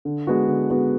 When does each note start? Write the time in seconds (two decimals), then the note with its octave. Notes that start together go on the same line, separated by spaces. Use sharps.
0.05 D3
0.27 G#3 B3 F#4
0.48 D3
0.70 G#3 B3 F#4